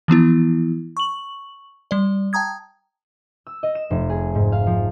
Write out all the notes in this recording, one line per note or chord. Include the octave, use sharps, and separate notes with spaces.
E3 F3 B3 E4
C#6 F#7
G3 D5
G5 A5 A#5 D#6 G#6
E6
D#5
E7
F1
G#4
G#2
F5
F3